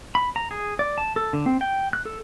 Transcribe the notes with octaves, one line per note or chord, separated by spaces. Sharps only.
B5
A#5
G#4
D5
A5
A4
D3
C4
G5
F#6
A4